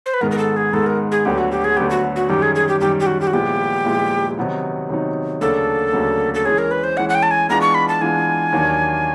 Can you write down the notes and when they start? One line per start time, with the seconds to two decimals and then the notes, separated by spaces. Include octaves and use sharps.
0.06 C5
0.14 B4
0.21 G#2 D#3 G#3 B3 A#4
0.31 A#4
0.38 A4
0.56 G#4
0.73 G#2 D#3 G#3 B3 A4
0.86 A#4
1.12 G#4
1.25 D2 D3 F#3 B3 G4
1.38 F#4
1.52 G4
1.64 G#4
1.77 D2 D3 F#3 B3 G4
1.90 F#4
2.16 F#4
2.29 F#2 D#3 G3 G4
2.42 G#4
2.55 G#4
2.69 G4
2.80 F#2 D#3 G3 G4
3.00 G4
3.06 F#4
3.21 G4
3.27 F#4
3.33 A#2 F3 G#3 B3 E4 G4
3.85 A#2 F3 G#3 B3 E4
4.38 C3 D#3 F#3 B3 D#4
4.90 C3 D#3 F#3 B3 D#4
5.41 D2 C#3 F#3 A#3 D4 A4
5.93 D2 C#3 F#3 A#3 D4
6.34 A4
6.45 E3 G#3 C#4 G#4
6.58 A#4
6.71 B4
6.84 C5
6.97 E3 G#3 C#4 F#5
7.09 F#5
7.15 G5
7.23 A5
7.31 G#5
7.49 E3 G#3 B3 D4 F4 A#5
7.61 C#6
7.74 B5
7.88 A5
8.01 E3 G#3 B3 D4 F4 G#5
8.53 D#2 D#3 F#3 A#3 D4